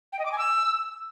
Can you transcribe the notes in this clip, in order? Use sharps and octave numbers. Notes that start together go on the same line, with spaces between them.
G5
D#5
D6
G#5
E6